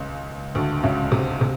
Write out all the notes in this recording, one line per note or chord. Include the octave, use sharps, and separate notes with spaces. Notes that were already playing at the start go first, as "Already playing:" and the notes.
Already playing: C#2 C#3
D2 D3
C#2 C#3
C3
C3